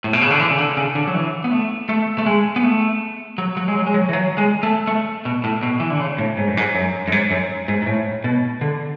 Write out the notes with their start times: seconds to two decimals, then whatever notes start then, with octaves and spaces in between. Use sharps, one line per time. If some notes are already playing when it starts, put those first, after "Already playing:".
0.04 A2
0.13 B2
0.21 C#3
0.31 D3
0.39 E3
0.50 C#3
0.58 D3
0.77 C#3
0.95 D3
1.07 F#3
1.14 E3
1.44 B3
1.51 A3
1.89 A3
2.18 A3
2.26 G#3
2.56 B3
2.64 A3
3.38 F#3
3.57 F#3
3.68 G#3
3.75 F#3
3.87 G#3
3.94 F#3
4.09 E3
4.13 F#3
4.38 G#3
4.63 A3
4.88 A3
5.25 B2
5.44 A2
5.63 B2
5.80 E3
5.90 D3
6.00 C#3
6.18 A2
6.37 G#2
6.47 F#2
6.57 G#2
6.75 F#2
7.08 F#2
7.12 G#2
7.31 F#2
7.68 G#2
7.82 G#2
7.87 A2
8.24 B2
8.61 D3